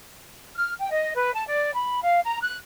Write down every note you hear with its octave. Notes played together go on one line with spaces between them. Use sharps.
F6
G5
D#5
B4
A5
D5
B5
F5
A#5
F#6